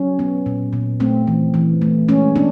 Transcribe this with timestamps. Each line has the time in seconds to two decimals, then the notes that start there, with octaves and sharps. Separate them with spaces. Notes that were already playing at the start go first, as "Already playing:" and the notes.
Already playing: F#3 C#4
0.19 B3
0.46 A#2
0.73 A#2
1.00 A3 C4
1.27 E3
1.54 E3
1.82 A3
2.08 G#3 C#4
2.35 B3 D4